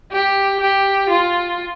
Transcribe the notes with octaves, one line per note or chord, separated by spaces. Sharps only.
G4
G4
F4